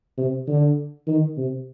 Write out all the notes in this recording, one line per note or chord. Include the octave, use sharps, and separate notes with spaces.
C3
D3
D#3
C3